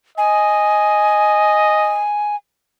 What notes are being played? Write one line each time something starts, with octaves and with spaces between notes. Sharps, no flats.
D#5 G#5